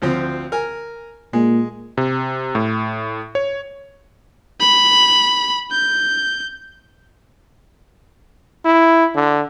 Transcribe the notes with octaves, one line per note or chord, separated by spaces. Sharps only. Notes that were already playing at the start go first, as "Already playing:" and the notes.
D2 F3 C4
A#4 G#5
A#2 G#3
C3
A2
C#5
B5
G6
E4
D3